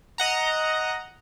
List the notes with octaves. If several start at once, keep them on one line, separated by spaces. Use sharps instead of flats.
D#5 F#5 A#5